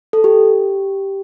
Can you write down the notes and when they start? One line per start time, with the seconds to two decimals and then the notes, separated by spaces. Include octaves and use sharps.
0.13 A4
0.24 G4